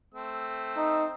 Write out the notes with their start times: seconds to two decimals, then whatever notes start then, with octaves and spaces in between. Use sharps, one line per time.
0.14 A3 C4 E6
0.77 D#4